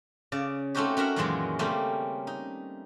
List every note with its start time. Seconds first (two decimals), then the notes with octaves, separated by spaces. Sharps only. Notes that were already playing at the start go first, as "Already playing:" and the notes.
0.32 C#3 D5
0.75 A3 C4 C#4 D#4 F#4 G4
0.97 C#4 F#4 A#4 E5 F#5
1.16 F#2 A#2 D#3 E3 F#3 G#3
1.59 C#3 G3 A3 A#3 C4 C#4
2.27 D#4